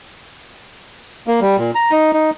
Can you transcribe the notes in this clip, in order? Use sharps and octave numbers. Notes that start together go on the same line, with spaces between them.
A#3
G3
A#2
A#5
D#4
D#4